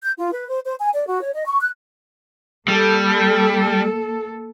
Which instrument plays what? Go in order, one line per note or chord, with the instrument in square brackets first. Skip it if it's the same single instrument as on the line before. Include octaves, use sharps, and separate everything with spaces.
[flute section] G6
F4
B4
C5
C5
G#5
D5
F#4
C#5
D#5
C#6
F#6
[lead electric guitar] G3 [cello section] A#3 A4